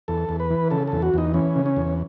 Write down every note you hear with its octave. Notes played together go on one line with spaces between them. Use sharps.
E2 A4
E2
B4
E3
C#3 A4
E2 A4
F#4
E2 D#4
E3 C#4
C#3
C#4
E2